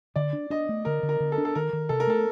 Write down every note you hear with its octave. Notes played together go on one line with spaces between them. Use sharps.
D3 D5
D4
D4 D#5
A3
D3 A#4
D3
A#4
D3
A4
D4
A4
D#3 A#4
D#3
C3 A4
A#4
A3 A4